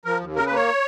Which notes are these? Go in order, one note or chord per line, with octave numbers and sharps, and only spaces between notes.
F3 A#4
D#2
C#3 A#4
B4
A#3 C#5